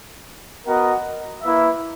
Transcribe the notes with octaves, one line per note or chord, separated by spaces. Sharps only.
B3 F#4 A#4 D#5 F#5
A#3 E4 B4 E5